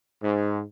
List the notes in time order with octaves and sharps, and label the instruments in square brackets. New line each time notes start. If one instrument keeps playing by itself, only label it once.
[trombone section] G#2